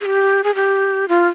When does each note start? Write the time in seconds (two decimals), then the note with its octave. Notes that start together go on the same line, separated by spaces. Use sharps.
0.01 G#4
0.06 G4
0.44 G#4
0.55 G4
1.09 F4